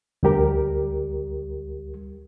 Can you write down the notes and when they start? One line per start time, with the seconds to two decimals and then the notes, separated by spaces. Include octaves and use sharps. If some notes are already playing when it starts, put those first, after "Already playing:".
0.23 D2 G3 G4 A#4